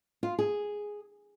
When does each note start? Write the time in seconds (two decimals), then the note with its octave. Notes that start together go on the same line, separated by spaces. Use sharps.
0.23 F4
0.39 G#4